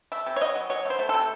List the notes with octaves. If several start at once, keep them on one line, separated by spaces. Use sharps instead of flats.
A3 E5
C3
C#5
F#3 D#5
F#3
F#3 C#5
A3
C5
A3
C3 A4